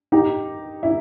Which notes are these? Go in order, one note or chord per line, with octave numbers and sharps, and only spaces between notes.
D#4 G4
E4